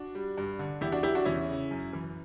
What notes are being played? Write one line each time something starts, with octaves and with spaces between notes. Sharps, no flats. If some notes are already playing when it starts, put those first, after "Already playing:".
Already playing: D4 F#4
G3
G2
D3
E2 E4 G4
D4 F#4
F#3 E4 G4
D4 F#4
E2 C#4 E4
C#3
F#2
E3